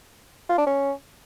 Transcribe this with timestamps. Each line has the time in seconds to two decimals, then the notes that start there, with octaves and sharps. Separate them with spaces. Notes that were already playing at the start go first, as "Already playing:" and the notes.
0.49 F4
0.58 D4
0.66 C#4